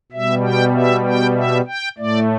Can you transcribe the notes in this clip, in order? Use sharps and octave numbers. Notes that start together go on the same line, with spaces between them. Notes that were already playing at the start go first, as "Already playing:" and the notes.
B2 G3 E5
G5
E5
G5
E5
G5
A2 A3 D5